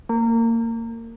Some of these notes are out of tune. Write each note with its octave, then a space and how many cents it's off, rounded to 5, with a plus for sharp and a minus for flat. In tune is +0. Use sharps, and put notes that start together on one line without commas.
A#3 -25